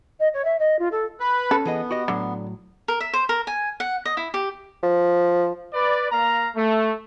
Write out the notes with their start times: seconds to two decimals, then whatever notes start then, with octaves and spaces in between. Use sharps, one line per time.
0.19 D#5
0.33 C#5
0.44 E5
0.59 D#5
0.79 F4
0.91 A4
1.20 B4 B5
1.51 C#4 A4
1.66 E3 B3 G#4 D#5
1.91 F#4 G4 D#5
2.08 A2 D3 F#3
2.88 A#4
3.00 E5
3.13 C5
3.29 A#4
3.47 G#5
3.80 F#5
4.05 D#5
4.17 E4
4.34 G4
4.83 F3
5.74 B4 D5
6.12 A#3 F5 A#5
6.56 A3